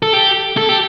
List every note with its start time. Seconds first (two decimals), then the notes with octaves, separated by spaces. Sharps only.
0.02 A4
0.13 G4
0.57 A4
0.69 G4